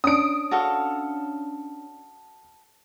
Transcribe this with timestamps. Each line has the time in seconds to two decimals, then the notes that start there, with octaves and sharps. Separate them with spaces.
0.04 C#4 D4 D#6 D7
0.51 F#4 A4 F5